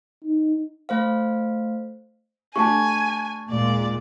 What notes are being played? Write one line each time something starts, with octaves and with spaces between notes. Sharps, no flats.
D#4
A3 C5 F5
A3 D4 G4 G#5 A5 C#6
D#2 A#2 G#3 D5